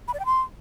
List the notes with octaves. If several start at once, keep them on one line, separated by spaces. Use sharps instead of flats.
B5
D5
G5
C6